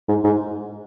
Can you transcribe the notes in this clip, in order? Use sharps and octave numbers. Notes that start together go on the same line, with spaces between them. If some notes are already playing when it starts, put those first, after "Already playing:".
G#2
G#2